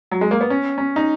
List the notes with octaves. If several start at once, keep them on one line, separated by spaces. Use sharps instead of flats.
F#3
G#3
A#3
B3
C#4
C#4
D#4